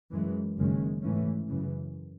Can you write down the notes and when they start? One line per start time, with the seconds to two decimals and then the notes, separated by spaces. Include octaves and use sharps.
0.11 F#2 E3 G#3
0.57 F#1 F#2 D#3 G#3 C#4
1.02 G#2 E3 A3 C#4
1.48 F#2 C#3 E3